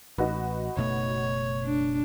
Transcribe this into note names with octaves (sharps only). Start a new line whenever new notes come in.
A1 D#4 F#4 B4
F#1 B2 A3 C#5
D4